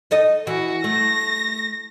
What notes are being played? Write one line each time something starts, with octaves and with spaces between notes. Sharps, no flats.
D#4 A4 D#5
E3 F#4
A3 A#6